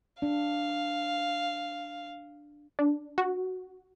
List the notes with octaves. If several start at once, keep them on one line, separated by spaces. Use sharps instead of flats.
D4 F5
D4
F#4